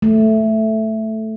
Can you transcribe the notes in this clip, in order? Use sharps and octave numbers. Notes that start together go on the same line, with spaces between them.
A3